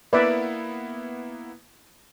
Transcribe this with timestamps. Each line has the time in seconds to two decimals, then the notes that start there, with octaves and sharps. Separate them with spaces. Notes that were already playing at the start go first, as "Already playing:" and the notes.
0.13 A#3 B3 E4 B4 D5 E5